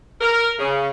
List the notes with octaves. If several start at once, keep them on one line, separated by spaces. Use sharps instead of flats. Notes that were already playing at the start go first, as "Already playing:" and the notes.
A#4
C#3